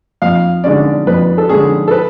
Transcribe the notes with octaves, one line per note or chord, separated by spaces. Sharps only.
F2 F5
D3 G#3 C#4 D5
F2 B4
A4
D3 G#3 C#4 G#4
A4
B4